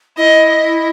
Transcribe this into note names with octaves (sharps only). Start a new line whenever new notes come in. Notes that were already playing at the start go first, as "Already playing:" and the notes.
E4 D#5
D#5